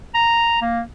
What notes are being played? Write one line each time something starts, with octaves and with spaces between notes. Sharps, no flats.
A#5
A#3